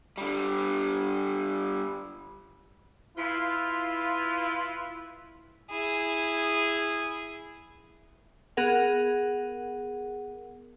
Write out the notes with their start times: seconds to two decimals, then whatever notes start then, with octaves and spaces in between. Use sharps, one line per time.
0.18 D3 G3
3.17 E4 F4 B4
5.70 E4 G#4
8.57 B3 G#4 A#4 F#5